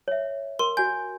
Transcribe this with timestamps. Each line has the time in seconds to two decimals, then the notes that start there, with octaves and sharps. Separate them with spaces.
0.08 C#5 E5
0.59 A#4 C6
0.77 F#4 G#5 G6